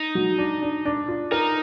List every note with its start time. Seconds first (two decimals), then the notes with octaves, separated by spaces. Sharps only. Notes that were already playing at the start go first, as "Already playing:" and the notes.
Already playing: D#4
0.15 F#3
0.38 D4
0.62 D4
0.85 D4
1.08 F4
1.32 D#4 A#4